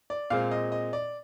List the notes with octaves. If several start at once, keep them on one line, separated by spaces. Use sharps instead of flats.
D5
A#2 G#3 C4 F5
D#5
D#5
D5